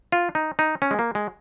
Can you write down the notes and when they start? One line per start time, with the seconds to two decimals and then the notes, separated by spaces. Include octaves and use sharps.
0.12 F4
0.35 D#4
0.59 D#4
0.82 C#4
0.91 G#3
0.99 A#3
1.15 G#3